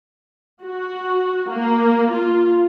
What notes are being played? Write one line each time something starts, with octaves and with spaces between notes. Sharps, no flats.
F#4
A#3
F4